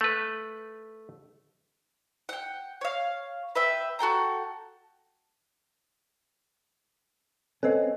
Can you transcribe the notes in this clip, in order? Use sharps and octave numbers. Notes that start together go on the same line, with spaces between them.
A3 B4
F#5 G5
C#5 F5
B4 E5 G5
F#4 A4 G5 A#5
C4 C#4 A4 B4 D#5